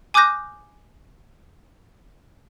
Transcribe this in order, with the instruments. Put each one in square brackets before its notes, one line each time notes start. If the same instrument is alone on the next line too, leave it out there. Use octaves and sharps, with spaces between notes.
[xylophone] G#5 D6 D#6 F#6 G6 A#6